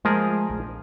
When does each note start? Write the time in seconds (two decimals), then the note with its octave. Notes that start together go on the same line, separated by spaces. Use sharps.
0.05 F3 G#3 A3 G#4 A#4
0.50 A#1